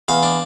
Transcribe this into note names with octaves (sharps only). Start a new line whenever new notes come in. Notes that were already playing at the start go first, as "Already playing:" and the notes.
E2 F5
D4